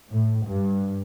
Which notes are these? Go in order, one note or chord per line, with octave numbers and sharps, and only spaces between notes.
A2
G2